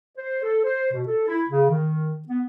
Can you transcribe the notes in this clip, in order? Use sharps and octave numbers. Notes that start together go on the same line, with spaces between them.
C5
A4
C5
B2
A4
E4
C#3
D#3
B3